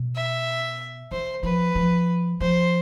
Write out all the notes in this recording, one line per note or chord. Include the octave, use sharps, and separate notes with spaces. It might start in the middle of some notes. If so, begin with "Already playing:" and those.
Already playing: B2
E5
E3 C5
F3 B4
F3
F3 C5